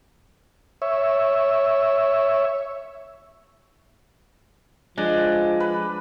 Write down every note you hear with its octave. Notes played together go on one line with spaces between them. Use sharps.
C#5 E5
F3 G#3 D4
B4